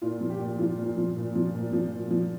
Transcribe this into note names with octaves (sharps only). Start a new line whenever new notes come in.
A#2 F4
F3
G4
A#2
F3 F4
A#2
F3
A#2
F3
A#2
F3
A#2
F3